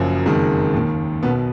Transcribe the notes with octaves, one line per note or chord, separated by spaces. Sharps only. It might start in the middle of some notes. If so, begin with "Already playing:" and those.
Already playing: F#1 F#2 F3 F#3
F#1 F2 D#3 G#3
D#2 D#3
B1 B2 B3